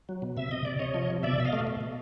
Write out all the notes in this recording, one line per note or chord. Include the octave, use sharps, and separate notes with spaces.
F#3
B2
C3 E5
C3 D#5
C3 D5
C3 C#5 D#5
F3
C3
B2 D5 E5
B2 E5
D#5 F5
A3
B2
B2